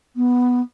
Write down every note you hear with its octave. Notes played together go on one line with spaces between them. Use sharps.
B3